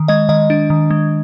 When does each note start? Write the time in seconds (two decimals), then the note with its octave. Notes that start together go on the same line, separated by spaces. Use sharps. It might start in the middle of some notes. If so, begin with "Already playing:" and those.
Already playing: D#3
0.08 G#3 D#5
0.29 D#3 D#5
0.50 D4
0.70 D#3
0.90 G#3